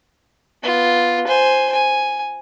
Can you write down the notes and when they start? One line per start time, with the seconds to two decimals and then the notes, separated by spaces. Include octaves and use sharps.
0.63 B3 F4
1.27 C5 G#5
1.73 G#5